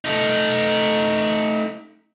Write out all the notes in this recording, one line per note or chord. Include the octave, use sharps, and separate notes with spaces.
A3 D#4